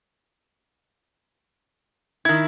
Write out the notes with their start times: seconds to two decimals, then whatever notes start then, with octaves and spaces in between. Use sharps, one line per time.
2.25 D#3 E4 G#6